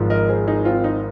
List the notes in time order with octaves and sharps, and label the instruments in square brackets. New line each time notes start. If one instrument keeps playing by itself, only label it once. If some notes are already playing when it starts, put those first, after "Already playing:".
Already playing: [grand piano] G#1 G#2 F3 G#3
A#4 D#5
G#4 C5
D#4 G#4
C4 F4
D#4